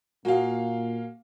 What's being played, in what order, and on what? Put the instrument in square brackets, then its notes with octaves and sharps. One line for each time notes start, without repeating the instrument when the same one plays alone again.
[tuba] A#2 [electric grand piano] A#3 F5 [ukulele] F#4 G#4